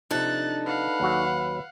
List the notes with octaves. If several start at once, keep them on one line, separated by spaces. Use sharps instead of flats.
C3 F3 D4 D#4 A4 F#6 A6
B4 F5 F#5
D#2 F#3 F#4